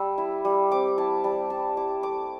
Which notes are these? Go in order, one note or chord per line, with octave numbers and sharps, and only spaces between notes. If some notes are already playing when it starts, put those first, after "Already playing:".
Already playing: G3 A5 E6
E4
G3
C4 D6
E4 A5
G3 A5
G3 A5
E4 D6
A3 D6